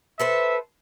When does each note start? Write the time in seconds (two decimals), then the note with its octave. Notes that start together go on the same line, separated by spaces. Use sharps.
0.20 A4 B4 C5 E5